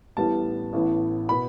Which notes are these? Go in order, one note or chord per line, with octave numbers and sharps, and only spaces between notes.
A1 A2 G3 B3 A5
A1 A2 E3 B3
B2 B3 B5